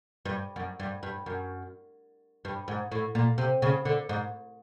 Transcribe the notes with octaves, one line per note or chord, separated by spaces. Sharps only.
G2
F#2
G2
G2
F#2
G2
G#2
A2
A#2
C3
C#3
D3
G#2